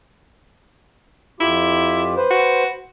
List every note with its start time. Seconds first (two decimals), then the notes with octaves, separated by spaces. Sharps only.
1.40 F2 E4 F4 G4
2.16 B4 C5
2.31 F#4